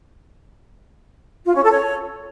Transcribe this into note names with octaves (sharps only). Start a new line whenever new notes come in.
F4
C#4
A4
C#5